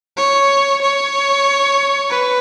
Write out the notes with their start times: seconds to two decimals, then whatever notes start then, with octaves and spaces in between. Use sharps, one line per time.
0.17 C#5
0.82 C#5
2.10 B4